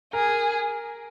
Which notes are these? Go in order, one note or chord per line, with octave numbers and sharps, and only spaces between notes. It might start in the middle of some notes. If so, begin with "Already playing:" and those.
G#4 A#4